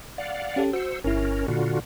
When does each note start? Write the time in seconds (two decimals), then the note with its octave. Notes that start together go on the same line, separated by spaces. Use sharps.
0.18 D5 F5 F#5
0.56 C#4 G4 A4
0.73 F#4 C5 E6 C#7
1.04 G1 C#4 E4 A#4
1.48 A#2 D3 F4 F#4